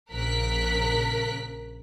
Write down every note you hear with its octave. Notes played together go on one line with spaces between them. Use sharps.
A#1 C#3 A#4 F#6 B6